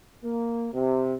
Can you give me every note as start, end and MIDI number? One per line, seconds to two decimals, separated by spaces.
0.23 0.68 58
0.73 1.14 48